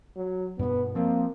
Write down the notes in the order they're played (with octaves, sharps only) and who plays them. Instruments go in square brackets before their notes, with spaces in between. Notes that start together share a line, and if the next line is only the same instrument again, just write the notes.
[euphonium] F#3
[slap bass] G2 B2 [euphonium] B3
[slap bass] F3 C4 [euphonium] A#3